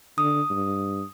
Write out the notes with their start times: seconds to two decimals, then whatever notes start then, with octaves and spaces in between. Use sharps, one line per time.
0.18 D3 D#6
0.50 G2